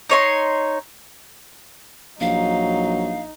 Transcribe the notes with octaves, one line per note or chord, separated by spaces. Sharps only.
D#4 C#5 C6
A#1 F#3 D#4 F5